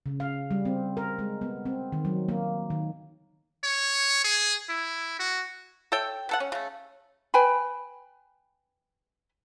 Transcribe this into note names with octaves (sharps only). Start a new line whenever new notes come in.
C#3
F5
G3
C4
A#4
G#3
B3
C4
D#3
F#3
A#3
D#3
C#5
G#4
E4
F#4
A4 C#5 E5 G5
B3 A4 F#5
C#4
C#3 A3
B4 G5 G#5 B5